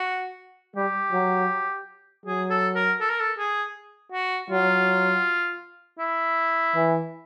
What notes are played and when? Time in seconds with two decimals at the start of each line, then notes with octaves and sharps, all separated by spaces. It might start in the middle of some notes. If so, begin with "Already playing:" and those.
Already playing: F#4
0.75 G3 G4
1.12 F#3
2.26 F#3 G#4
2.50 A4
2.75 A#4
3.01 A4
3.10 A#4
3.20 A4
3.38 G#4
4.12 F#4
4.50 F#3 F4
5.99 E4
6.75 E3